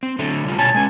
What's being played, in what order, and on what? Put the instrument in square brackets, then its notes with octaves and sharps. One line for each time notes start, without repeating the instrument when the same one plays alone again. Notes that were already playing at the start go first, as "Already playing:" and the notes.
[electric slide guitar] C4
D3 F#3 A3
C#3 G3 F4
[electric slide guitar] B2 C#5 G#5 [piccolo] A5
[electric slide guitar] G#3 C#4 [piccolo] G#5